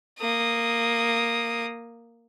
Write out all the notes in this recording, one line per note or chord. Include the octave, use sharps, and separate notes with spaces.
A#3 D#6